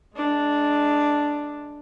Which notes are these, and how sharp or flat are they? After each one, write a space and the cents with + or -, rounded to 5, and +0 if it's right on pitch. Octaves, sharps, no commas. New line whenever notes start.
G#3 +25 D4 +0